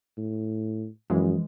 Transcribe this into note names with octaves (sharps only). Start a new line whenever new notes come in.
A2
F#2 E3 F3 G#3